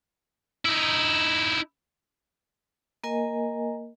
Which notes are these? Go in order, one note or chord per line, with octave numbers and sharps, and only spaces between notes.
D#4 E4
A#3 A#4 D#5 G#5